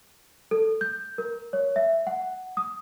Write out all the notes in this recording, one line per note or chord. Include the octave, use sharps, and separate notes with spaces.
A4
G6
A#4
C#5
E5
F#5
D#6